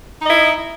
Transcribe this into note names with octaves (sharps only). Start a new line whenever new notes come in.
D#4 E4 D#5